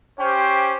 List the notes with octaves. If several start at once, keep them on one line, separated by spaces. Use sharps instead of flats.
C#4 G4 C5 G5